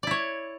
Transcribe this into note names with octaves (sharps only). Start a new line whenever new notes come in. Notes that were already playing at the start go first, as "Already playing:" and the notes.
E4 C#5 D5